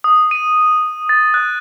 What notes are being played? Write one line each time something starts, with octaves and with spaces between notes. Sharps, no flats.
D#6
D#7
A6
F#6